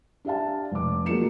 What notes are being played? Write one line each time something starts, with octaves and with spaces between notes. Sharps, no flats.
D4 G4 E5 F5 A5
F1 D6
F#3 G#3 A#3 F4 C#7 E7